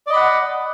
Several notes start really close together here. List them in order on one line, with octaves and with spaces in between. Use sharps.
D5 D#5 B5 F#5